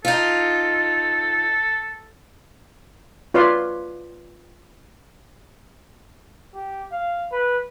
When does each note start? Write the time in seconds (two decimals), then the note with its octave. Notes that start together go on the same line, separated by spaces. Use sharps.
0.05 D#4 F4 A4
3.34 F4 B4 C#5 D5 F5 C6
6.55 G4
6.92 F5
7.32 B4